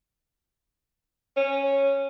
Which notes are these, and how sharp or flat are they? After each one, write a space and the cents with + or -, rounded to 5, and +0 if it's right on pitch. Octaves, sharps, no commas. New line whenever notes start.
C#4 -10